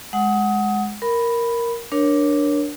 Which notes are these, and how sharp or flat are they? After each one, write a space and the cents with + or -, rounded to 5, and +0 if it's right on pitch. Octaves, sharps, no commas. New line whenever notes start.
G#3 +5 F#5 +0 D#6 +25
A#4 +0 B5 +0
D4 +0 A#4 +20 C#5 +0